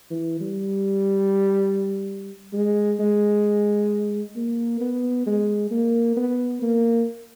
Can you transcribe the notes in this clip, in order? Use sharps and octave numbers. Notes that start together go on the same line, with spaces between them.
E3
G3
G#3
G#3
A#3
B3
G#3
A#3
B3
A#3